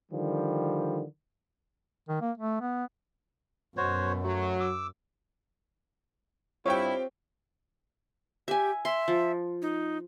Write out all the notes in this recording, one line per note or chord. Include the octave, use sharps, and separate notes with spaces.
D3 D#3 F3 G3
D#3
A#3
A3
B3
F#2 B2 F#4 C5 C#5
F#3 A3
D6 E6
G2 G3 C4 E4 F4 G4 C#5 G5
G4 E5 G#5
E5 C6
F3
D#4